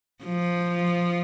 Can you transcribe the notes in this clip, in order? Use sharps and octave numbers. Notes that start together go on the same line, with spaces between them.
F3